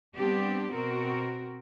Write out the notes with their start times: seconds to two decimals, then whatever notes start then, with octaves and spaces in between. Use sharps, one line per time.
0.15 G3 B3 C4 D4 G4
0.72 B2 C4 F#4 A#4